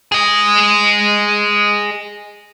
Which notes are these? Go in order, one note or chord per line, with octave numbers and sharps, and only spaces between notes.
G#4 D#5